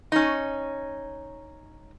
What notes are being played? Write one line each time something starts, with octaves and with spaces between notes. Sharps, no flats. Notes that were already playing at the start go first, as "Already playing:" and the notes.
C#4 D#4